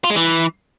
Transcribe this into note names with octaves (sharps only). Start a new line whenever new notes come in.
F4
G#3
E3